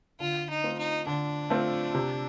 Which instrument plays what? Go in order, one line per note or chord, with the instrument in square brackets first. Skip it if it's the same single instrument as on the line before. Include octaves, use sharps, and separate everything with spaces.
[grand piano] D3 [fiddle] F4
[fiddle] D#4
[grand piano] A3 C4 F4
[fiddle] D#4
[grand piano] D3 [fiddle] D4
[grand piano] A3 C4 F4
C3